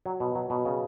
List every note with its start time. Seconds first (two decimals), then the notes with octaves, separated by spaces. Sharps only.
0.06 F#3
0.20 B2
0.35 F#3
0.50 B2
0.65 C#3